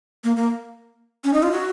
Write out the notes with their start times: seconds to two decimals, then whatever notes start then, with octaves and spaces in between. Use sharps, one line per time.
0.24 A#3
0.36 A#3
1.24 C#4
1.33 D#4
1.43 F4
1.52 F#4